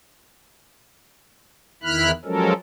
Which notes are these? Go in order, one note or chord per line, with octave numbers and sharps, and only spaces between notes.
E2 D#3 E4 B5 F6 F#6
F3 F#3 G#3 C#4 A4 A#4